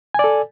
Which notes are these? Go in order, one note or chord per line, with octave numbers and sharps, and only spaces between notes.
A4 D5 G#5